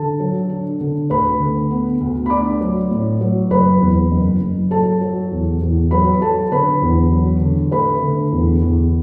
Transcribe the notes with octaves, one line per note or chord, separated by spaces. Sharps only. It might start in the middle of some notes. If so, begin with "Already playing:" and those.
Already playing: D3 A4 A5
F#3
D4
D3
D2 B4 B5
D3
B3
D2
B5
D4 D5 D6
F#3
A2
F#3
F#1 B4 B5
E2
F#1
F#1
F#3 A4 A5
F#3
E2
E2
F#3 B4 B5
F#3 A4 A5
D3 B4 B5
E2
F#3
D3
A3 B4 B5
D3
E2
E2